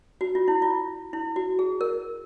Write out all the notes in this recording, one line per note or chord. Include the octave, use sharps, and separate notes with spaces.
F#4
F4
E4
F4
E4
F#4
G#4
A#4